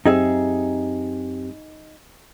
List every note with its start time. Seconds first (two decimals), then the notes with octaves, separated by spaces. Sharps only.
0.06 F#2 C4 D#4 G4 G#4 E5